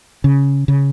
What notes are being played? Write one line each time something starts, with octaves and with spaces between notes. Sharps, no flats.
C#3
C#3